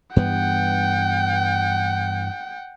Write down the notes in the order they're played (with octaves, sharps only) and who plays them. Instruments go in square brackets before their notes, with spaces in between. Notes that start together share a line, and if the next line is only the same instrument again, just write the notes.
[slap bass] G2 E3 B3 [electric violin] F#5 G5